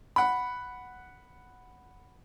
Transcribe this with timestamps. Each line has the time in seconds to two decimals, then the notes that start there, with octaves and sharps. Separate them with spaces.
0.16 F#5 B5